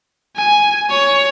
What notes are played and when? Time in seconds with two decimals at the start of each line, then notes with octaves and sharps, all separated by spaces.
0.36 G#5
0.90 C#5